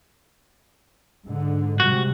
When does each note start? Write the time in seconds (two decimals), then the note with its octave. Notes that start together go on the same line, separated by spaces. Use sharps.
1.24 G#2 D3
1.80 C3 G3 G#3 F#4